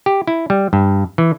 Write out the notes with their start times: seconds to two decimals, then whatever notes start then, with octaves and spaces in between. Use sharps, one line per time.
0.06 G4
0.27 E4
0.50 G3
0.73 G2
1.18 E3